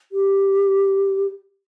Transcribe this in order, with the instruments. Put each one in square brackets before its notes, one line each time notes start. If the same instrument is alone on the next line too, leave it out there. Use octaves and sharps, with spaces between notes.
[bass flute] G4